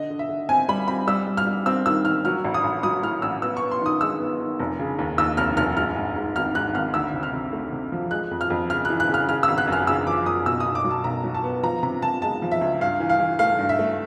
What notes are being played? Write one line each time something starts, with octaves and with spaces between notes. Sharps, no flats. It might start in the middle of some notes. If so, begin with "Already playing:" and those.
Already playing: D3 D#5
D3
E5
D3
C4 G#5
G3 B5
C4 B5
G3 E6
G3
F6
G3
C4 E6
D#3 E6
D#3 F6
F#3 F6
A1
D#6
A1
F#3 D#6
A2 F6
A1 E6
B3 E6
C#6
B3
C6
D#3 D#6
G#3 E6
B3
D#3
F1
C#3
D#2
D#2 E6
F1 F6
F1 F6
G#2 F6
G#2
G#2
G#1 F6
G#2 F#6
G#1 F6
D2 E6
C3
F6
C3
A3
C3
F3
G#3 F#6
F2
F6
F2
C#3 F6
F#6
E3
F#6
C#3 F6
C#3 F6
E6
G#1
F#6
F#2 F6
C#3 E6
F3 D6
F#2 D#6
B2 E6
D#6
B1
D6
F#3
A5
B1 A#5
F#3
A5
B3
F3 A#5
C3 A#5
C3 A5
G#3 A5
F3
E5
C#2
G2 F5
E3
F5
E3
A3 F5
G2
E5
A3